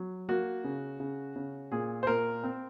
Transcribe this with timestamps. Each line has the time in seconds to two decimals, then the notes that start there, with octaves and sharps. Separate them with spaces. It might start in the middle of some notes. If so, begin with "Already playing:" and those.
Already playing: F#3
0.29 A#3 F#4
0.64 C#3
1.00 C#3
1.36 C#3
1.72 A#2 G#4
2.03 C5
2.07 A#2 A#4
2.44 C4